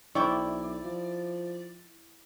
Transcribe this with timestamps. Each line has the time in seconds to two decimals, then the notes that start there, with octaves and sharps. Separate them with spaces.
0.15 B1 C3 E4 D5 G5 C#6
0.85 F3